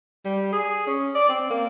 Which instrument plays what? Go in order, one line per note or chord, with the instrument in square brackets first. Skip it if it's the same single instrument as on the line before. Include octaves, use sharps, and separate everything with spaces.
[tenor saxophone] G3
G#4
C#4
D5
C4
A#3